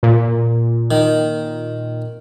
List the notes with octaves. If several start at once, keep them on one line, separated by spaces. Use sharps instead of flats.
A#2
D#3